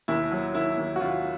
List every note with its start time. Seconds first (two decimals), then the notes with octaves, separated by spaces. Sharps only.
0.08 D#2 E4
0.32 F#3
0.54 D#3 E4
0.77 D#2
0.96 F#4
1.00 D#2 F4